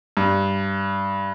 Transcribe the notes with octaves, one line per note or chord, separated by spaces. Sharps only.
G2